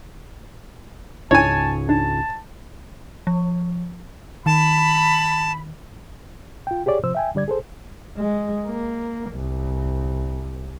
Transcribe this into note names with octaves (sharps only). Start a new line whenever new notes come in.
C#2 G#2 C#4 D4 E4 C#5 G#5 A5
D4 D#4 A5
F3
D#3 A5 B5
F4 G5
G4 G#4 C#5 D5
C3 F3 C5 E6
E5 G5 G#5
D3 G3 D5 G#6
G#4 A4 C5
G#3
A#3
C2